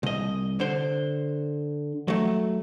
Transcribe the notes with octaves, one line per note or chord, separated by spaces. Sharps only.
C2 D#5
D3 C5
F#3 A3